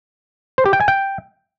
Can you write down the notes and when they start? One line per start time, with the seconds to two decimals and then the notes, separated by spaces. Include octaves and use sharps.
0.58 C5
0.66 G4
0.73 G5
0.80 G#5
0.88 G5